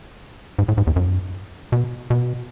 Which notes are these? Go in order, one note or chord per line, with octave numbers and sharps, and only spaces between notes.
G#2
A2
G#2
E2
F#2
B2
B2